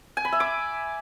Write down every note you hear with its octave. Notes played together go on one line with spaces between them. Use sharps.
G#5
B5
E5
D6